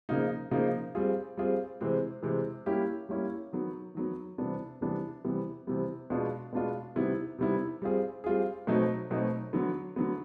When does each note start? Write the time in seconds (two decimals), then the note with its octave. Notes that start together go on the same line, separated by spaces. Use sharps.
0.09 C#3 F3 A#3 D#4
0.51 C#3 F3 A#3 D#4
0.95 G3 C4 F4 G#4
1.37 G3 C4 F4 G#4
1.81 C3 E3 G#3 C4
2.23 C3 E3 G#3 C4
2.66 G3 A#3 C#4 E4 G4
3.09 G3 A#3 C#4 E4 G4
3.53 D#3 F#3 B3
3.95 D#3 F#3 B3
4.38 C3 E3 G3 B3 D4
4.81 C3 E3 G3 B3 D4
5.24 C3 E3 G3 B3
5.67 C3 E3 G3 B3
6.10 B2 G#3 B3 D4 F4
6.53 B2 G#3 B3 D4 F4
6.96 C3 D#3 G3 B3 E4
7.38 C3 D#3 G3 B3 E4
7.82 G3 C4 F4 G#4
8.24 G3 C4 F4 G#4
8.67 B2 F#3 A3 C4 D#4
9.10 B2 F#3 A3 C4 D#4
9.53 D3 F#3 B3
9.96 D3 F#3 B3